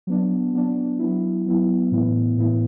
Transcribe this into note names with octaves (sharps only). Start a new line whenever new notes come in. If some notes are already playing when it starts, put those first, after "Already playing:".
F#3 B3 D4
F#3 B3 D4
F#3 B3 E4
F#3 B3 E4
A2 E3 B3 E4
A2 E3 B3 E4